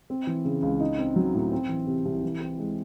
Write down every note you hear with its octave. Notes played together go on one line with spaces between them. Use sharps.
C4
E3
C#3
C#2
D#4
C4
F#3
A2
C4
E3
C3
C2
E3
C4
G#3